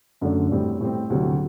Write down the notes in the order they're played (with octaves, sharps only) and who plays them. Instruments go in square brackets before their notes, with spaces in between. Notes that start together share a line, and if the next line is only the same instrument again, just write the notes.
[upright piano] F#2 D3 A3 D4
A2 G3 C4
A2 G3 C4
D2 C3 F#3 C4 E4